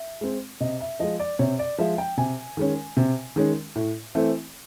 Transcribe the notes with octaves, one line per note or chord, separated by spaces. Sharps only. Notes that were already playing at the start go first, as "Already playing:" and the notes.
Already playing: E5
G#3 C4
C3 D#5
E5
F3 G#3 D#5
D5
C3 C#5
D5
F3 G#3 E5
G5
C3 G#5
D#3 G#3 C#4
C3
D#3 G#3 C#4
A2
E3 A3 C4